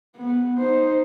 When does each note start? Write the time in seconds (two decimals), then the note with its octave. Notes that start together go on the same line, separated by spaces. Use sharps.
0.17 B3
0.58 D#4 C5